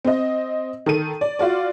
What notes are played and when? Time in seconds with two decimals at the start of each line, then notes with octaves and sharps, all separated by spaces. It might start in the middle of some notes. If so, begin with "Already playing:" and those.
0.05 C4 D#5
0.86 D#3 A4 D#7
1.21 D5
1.39 F4 F#4 D5